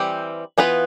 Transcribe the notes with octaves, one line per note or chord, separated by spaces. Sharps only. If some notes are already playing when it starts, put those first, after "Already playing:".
Already playing: E3 G3 C4 G4
E3 B3 F4 B4